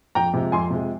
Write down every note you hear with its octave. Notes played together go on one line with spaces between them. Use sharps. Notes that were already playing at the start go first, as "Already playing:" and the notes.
F2 G5 A#5
C3 F3 G#3
F2 G#5 C6
C3 F3 G#3